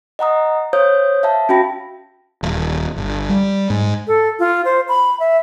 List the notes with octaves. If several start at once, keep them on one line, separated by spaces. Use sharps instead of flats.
D#5 F#5 A#5 D#6
C5 C#5 F5 D#6 G6
E5 F5 A5
C#4 F#4 G5 B5 A#6
D#1
G1
G3
G#2
A4
F4
C5
B5
E5